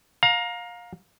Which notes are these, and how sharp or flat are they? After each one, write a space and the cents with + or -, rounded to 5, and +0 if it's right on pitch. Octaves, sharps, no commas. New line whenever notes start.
F5 +25 A#5 +10